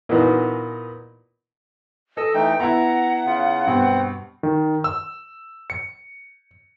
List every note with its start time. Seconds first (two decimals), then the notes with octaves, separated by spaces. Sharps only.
0.09 A#2 E3 B3 D#4 F#4
2.17 A4 D#5 E6
2.34 E3 A3 D#4 G5
2.60 B3 E4 F#5 A#5
3.26 C#3 F4
3.66 G2 B2 C4
4.43 D#3
4.84 E6
5.70 C#7